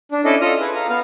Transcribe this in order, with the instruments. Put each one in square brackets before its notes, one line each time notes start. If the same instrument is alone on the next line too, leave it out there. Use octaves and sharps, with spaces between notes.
[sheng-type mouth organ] D4
C#4 E4 A4 D5 D#5
F4 A4 D#5 D#6 F6
G#4 B4
F5 A#5
B3 F5